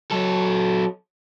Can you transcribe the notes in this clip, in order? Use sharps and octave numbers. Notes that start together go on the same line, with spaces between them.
F#3 A4